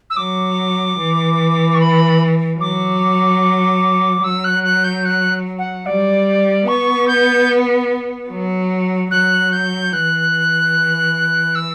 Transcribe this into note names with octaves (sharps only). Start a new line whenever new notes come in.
E6
F#3 D6
E3
C#6
B5
F#3 D6
F#3 E6
F#6
F#6
G6
F#6
F#5
G3 D5
B3 C#6
G6
F#3
F#3 F#6
G6
E3 F#6
E6